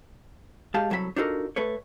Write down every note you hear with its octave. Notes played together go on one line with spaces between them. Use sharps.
G#2 G#3 G4 F5 A5
C2 F#3 A4 E5 B5
D4 D#4 F4 F#4 A4 A#4
A3 A4 B4 C#5